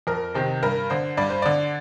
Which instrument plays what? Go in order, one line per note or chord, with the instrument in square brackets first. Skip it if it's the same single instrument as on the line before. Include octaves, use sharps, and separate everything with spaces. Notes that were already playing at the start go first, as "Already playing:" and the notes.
[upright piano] F2 A#4
C3 D#3 C5
G2 A#4
D3 C5
G2 D5
C5
D3 D5